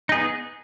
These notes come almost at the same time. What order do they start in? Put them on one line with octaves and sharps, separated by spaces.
D#4 G#4 B3